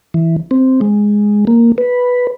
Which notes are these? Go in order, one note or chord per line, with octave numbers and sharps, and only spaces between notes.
E3
C4
G#3
A#3
B4